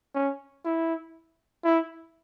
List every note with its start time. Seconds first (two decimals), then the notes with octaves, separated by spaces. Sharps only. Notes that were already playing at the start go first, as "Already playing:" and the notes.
0.15 C#4
0.65 E4
1.64 E4